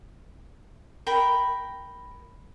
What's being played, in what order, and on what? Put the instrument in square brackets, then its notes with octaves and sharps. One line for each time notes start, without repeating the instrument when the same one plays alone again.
[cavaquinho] A#4 G5 B5